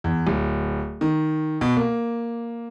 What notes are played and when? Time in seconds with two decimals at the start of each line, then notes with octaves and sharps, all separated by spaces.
0.04 E2
0.27 D1
1.01 D#3
1.61 B2
1.77 A#3